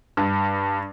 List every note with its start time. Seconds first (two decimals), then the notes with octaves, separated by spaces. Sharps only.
0.17 G2